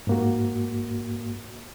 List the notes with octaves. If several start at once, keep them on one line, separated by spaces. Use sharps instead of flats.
G#2 A#3 F#4